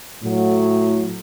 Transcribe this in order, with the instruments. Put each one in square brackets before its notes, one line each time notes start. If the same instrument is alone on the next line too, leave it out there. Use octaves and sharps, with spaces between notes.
[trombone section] A2 F#3